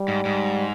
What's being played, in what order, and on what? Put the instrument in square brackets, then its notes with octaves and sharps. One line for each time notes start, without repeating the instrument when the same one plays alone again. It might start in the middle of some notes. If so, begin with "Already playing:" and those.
Already playing: [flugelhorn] G3
[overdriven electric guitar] G#2
G#2